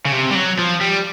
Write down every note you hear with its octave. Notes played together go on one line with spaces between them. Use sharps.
C#3
C3
G3
F#3
F3
G3